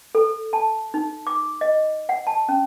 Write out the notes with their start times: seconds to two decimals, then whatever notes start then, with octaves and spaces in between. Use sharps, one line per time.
0.15 A4
0.53 A5
0.94 D#4
1.27 D6
1.61 D#5
2.09 F#5
2.27 A5
2.49 C#4